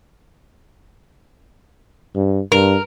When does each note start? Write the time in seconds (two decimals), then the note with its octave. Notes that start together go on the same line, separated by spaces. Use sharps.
2.15 G2
2.52 G2 A#4